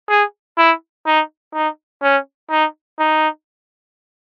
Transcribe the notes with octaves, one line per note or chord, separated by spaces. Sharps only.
G#4
E4
D#4
D#4
C#4
D#4
D#4